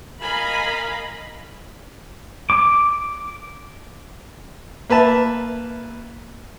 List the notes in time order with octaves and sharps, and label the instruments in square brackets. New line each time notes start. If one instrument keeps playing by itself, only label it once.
[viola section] A#4 D#5 F5 G#5 A#5 B5
[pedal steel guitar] D6
[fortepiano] A#3 B4 E5 A5